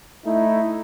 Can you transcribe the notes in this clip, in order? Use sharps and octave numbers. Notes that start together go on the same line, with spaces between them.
A3 D#4 E4